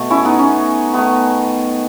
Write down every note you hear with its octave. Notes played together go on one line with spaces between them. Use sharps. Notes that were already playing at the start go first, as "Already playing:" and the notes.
Already playing: B2 A3
C#4 E4
B3 D#4
C#4
D#3 A3 B3